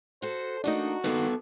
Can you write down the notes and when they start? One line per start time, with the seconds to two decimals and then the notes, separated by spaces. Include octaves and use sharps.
0.22 F#4 A4 C5
0.64 E3 A3 A#3 D4 D#4 F#4
1.04 G2 D#3 A#3 B3 A4 B4